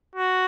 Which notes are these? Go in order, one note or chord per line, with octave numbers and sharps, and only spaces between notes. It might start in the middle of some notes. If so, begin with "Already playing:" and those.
F#4